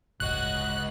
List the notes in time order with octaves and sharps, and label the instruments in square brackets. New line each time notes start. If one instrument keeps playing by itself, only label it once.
[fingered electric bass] D1 G1 [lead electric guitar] C#2 D#5 [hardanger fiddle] F#4 [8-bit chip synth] F#6